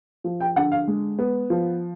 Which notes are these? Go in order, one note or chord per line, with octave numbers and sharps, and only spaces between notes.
F3
G5
D3 F#5
F5
G#3
B3
F3